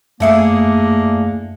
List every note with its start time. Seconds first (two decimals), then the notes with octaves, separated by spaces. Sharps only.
0.20 F#2 A3 A#3 D4 E4 G#4 C#7